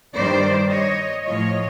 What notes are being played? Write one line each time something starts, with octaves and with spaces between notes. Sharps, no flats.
G2 D#3 G3 C5 D5
C#5 D#5
A2 F3 C#5 D#5